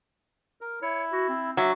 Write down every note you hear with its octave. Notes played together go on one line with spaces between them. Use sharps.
A#4
E4 C#5
F#4
C4
F#3 E5